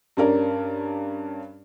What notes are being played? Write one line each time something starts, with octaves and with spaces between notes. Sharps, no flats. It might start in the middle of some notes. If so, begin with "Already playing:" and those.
G2 C#4 A#4 D5